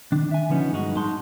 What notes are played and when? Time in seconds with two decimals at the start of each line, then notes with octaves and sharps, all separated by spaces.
0.12 D#3 D4
0.31 E5 G#5
0.49 D3 F3 B3 C#4 D#4
0.72 G2 G#3 D#4 F#4
0.96 G#2 G#3 D#4 A5 C6